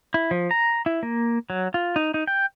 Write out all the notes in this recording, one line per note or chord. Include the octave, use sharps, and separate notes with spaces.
E4
F3
A#5
E4
A#3
F#3
F4
D#4
D#4
G5